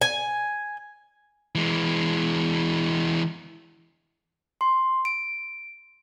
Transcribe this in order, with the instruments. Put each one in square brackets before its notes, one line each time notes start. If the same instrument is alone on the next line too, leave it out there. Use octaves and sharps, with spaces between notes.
[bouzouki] G#5
[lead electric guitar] E3 G#3
[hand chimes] C6
D7